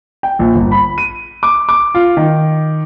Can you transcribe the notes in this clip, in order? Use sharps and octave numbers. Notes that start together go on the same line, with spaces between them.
G5
A#1
G1
B5
D#7
D6
D6
F4
D#3